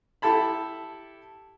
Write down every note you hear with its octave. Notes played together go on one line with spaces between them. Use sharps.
E4 G4 A4 A5 B5